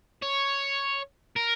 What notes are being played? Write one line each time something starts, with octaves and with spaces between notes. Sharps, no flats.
C#5
A#4